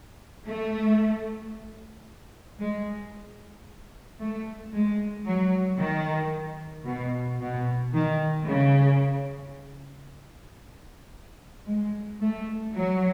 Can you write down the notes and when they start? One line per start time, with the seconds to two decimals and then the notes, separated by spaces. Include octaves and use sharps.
0.46 A3
2.60 G#3
4.20 A3
4.73 G#3
5.26 F#3
5.80 D#3
6.86 B2
7.40 B2
7.94 D#3
8.47 C#3
11.67 G#3
12.21 A3
12.74 F#3